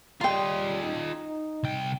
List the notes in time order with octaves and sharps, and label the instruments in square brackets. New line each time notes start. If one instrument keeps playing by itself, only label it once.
[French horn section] C#3 G3 [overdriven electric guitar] F4 D#5 [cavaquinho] G5 C6
[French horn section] D#4
[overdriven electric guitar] C2 G5